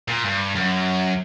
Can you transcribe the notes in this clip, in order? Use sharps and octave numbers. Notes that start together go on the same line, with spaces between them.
A#2
G2
F#2